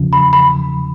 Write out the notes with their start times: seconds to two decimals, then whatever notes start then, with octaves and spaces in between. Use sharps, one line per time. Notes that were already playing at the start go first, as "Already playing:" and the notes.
Already playing: E2 C#3 F3
0.13 B5
0.33 B5